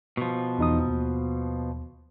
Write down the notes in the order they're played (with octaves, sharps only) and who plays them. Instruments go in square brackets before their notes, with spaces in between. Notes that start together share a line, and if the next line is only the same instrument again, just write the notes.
[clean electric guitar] B2 F3
[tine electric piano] E2 D#4 D#6
D#2